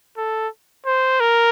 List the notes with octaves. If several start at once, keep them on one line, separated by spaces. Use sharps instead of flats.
A4
C5
A#4